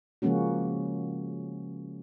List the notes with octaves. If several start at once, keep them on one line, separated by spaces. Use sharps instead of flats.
C#3 F3 G#3 A#3 C#4 F#4